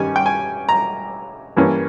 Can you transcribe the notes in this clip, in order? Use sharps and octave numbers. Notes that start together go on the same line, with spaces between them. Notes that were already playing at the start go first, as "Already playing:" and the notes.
Already playing: G2 D#3 G3 C#4 G#5
G5
G#5
A#5
G2 E3 A#3 C#4